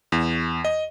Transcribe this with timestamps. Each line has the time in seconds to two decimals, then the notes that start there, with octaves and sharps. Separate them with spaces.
0.12 E2
0.65 D#5